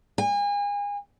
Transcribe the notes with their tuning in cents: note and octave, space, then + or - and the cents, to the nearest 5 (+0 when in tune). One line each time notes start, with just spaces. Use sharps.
G#5 -35